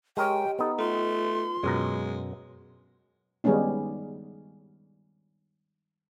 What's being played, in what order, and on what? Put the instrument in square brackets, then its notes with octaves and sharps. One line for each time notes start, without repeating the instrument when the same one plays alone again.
[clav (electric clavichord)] G#3 A#4 C#5 [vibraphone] G4 D#5 [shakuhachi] G5
[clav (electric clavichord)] B3 D#4 [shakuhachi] A4
[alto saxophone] A3 [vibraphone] F4 [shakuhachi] C6
[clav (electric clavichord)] F#2 B2 A#5 [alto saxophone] G#3
[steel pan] D#3 G3 G#3 B3 C#4 D#4